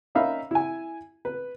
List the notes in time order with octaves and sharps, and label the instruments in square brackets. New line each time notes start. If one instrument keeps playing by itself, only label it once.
[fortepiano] A#3 C#4 D#4 E5 F5 B5
E4 G#5
B4